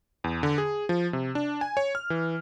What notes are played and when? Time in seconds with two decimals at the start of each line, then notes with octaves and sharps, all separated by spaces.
0.24 E2
0.43 D3
0.58 G#4
0.89 F3
1.13 C3
1.35 D4
1.61 G#5
1.77 C#5
1.95 F6
2.10 E3